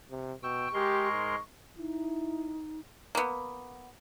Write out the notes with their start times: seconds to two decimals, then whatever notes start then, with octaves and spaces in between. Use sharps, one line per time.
0.10 C3
0.43 B2 G5 C#6 E6
0.74 G#3 G4 A#4 C6
1.11 G#2
1.79 D#4 E4
3.15 A#3 B3